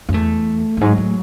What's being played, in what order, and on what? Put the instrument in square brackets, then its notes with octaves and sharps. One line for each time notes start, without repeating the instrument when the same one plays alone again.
[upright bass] F#2
[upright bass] E2 [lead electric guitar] A3
[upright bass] F#2
[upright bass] G#2 [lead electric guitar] F#3
[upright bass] A2